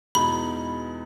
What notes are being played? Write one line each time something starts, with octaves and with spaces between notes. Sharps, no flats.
E2 B2 G#3 D#4 B5